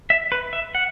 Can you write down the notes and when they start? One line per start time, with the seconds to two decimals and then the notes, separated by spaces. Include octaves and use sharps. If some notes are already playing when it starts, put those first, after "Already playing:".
0.10 E5
0.32 B4
0.53 E5
0.75 F#5